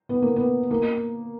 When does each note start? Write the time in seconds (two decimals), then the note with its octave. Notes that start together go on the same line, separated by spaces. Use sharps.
0.09 B3
0.22 A#3
0.36 B3
0.71 A#3